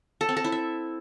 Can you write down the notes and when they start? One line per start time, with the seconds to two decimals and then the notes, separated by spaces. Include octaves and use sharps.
0.21 A4
0.29 C4
0.37 A4
0.44 E4
0.52 E5